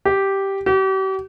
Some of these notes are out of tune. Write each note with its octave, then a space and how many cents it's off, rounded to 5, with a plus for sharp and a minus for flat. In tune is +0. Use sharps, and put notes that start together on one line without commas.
G4 -5
G4 -40